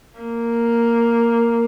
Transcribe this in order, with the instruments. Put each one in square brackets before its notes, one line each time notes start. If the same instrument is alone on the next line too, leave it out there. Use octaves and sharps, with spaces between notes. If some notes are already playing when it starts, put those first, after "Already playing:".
[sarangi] A#3